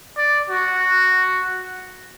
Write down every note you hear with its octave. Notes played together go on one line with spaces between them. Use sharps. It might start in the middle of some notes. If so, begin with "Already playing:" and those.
D5
F#4